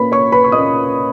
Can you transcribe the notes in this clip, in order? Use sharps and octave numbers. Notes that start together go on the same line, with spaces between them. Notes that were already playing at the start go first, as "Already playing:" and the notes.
Already playing: A#2 A#3 C#4 B4 B5
C#5 C#6
B4 B5
C#6
A#2 A#3 C#4 D#5 D#6